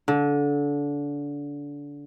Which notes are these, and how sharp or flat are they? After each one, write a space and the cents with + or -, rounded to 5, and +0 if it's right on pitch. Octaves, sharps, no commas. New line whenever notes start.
D3 -25